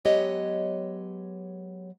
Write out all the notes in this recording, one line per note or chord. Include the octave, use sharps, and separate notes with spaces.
F#3 G#3 B3 G4 C#5 D#5